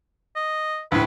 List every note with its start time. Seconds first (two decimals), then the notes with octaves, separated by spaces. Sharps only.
0.36 D#5
0.92 D2 A2 B4